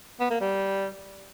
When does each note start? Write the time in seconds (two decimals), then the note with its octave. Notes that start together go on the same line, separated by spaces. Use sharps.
0.20 B3
0.30 A#3
0.40 G3